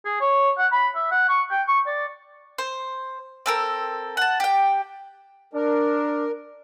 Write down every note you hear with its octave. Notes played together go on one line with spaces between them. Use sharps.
G#4
C#5
F#5
B5
E5
F#5
C#6
G5
C#6
D5
C5
C4 A4 A#4
F#5 A5
G4 G5
D4 A#4